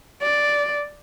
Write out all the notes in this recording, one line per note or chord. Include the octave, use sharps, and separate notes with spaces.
D5